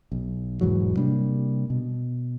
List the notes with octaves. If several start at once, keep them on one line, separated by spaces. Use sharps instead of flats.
B1
E1 G#2 E3 F#3
C3 G3 A#3 D4
B2